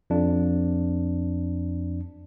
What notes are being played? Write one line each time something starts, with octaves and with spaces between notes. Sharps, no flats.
F2 D4